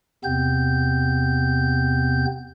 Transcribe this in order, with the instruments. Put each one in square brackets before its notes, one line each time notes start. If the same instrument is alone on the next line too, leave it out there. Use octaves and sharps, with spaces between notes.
[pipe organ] E2 C3 B3 C4 G6